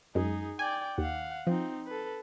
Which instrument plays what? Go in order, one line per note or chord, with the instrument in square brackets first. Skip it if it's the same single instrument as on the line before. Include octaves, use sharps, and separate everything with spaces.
[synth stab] F#2 G#3 [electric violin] D#4 G#4
[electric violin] D5 G5 [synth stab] G#5
[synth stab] D#2 [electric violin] F5 F#5
[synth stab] F3 [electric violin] C4 D#4
[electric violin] A4 B4